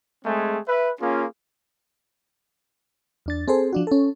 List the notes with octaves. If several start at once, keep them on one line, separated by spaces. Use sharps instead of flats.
G#3 A3 C4 G#4
B4 E5
A#3 C#4 F4 G#4
E2 D4 A6
C4 G#4 A4 C5
F3 D4 F#4
C#4 A4